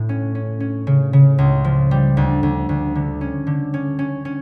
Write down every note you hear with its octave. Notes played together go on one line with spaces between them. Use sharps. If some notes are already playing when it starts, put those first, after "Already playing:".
Already playing: A2
C#4
C#4
C#4
C#3
C#3
C#2
F3
G3
D2
D2
D2
D3
C#4
D3
C#4
C#4
C#4